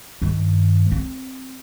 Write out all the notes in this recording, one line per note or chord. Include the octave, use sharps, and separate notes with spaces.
G2 D#3
C4